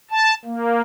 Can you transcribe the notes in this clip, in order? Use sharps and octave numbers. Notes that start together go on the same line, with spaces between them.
A5
A#3